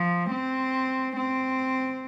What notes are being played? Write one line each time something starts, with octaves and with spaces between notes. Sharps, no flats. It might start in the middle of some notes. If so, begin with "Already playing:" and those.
Already playing: F3
C4
C4